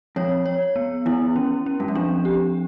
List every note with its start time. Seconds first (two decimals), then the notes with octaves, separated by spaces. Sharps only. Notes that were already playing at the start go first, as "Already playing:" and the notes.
0.16 F2 C#5
0.46 C#5
0.76 B3
1.06 E2 E4
1.36 C#4
1.66 C#4
1.80 G2
1.88 F#2
1.95 F2 D4
2.25 G4